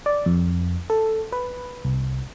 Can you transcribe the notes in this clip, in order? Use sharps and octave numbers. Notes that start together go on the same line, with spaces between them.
D5
F2
A4
B4
C2